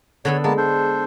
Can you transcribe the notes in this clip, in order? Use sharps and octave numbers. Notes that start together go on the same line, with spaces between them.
D3 B3 A4 C#5
G#3 A#3 B3 A5
D4 A4 C5